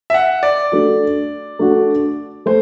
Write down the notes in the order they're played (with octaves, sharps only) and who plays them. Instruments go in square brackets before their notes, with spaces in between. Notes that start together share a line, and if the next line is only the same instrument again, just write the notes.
[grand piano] E5
F#5
D5
[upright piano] A3 D4 F#4
A3 D4 F#4
[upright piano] A3 [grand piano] C5